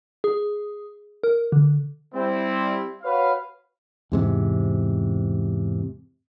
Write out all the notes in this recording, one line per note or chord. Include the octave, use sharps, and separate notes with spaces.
G#4
A#4
D3
G3 C4 E4
F#4 B4 C#5 F5
E2 G#2 C3